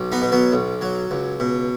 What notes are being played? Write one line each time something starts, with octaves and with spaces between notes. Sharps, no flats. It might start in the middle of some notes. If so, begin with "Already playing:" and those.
Already playing: B1
B3 D#4
B2
F#3 B3
B1
F#3
C#2
B2